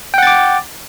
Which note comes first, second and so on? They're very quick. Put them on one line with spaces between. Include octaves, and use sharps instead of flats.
G5 F#5 A6 D6